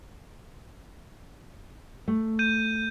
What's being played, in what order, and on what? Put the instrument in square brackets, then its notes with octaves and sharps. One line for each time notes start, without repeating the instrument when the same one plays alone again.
[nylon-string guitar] A3
[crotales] G6 D#7